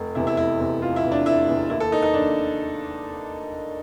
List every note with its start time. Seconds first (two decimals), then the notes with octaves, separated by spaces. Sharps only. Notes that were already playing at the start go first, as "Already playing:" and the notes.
Already playing: F1
0.15 E2 C3 E4
0.27 E4
0.37 F1 E4
0.60 E2 C3
0.82 F1 F4
0.96 E4
1.04 E2 C3
1.12 D4
1.26 F1 E4
1.48 E2 C3
1.70 D#2 E4
1.80 A4
1.92 D#3 D#4
2.03 D#4
2.14 D#2 D4